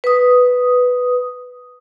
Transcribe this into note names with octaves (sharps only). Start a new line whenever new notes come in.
B4 D#6